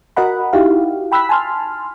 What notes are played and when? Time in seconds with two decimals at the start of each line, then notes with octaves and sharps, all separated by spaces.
0.17 F#4 A#4 D#5 F#5 B5
0.53 D#4 E4 F#4 G4 F5
1.12 G5 B5 E6 F#6 B6
1.29 G#5 A5 C6 F6